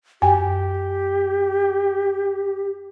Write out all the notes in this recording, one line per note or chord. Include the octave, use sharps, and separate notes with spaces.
F#2 G4 G5 G#5